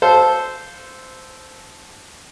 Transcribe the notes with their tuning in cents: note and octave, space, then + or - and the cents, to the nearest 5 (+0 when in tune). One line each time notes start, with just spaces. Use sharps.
A4 -10 C5 -10 F5 +0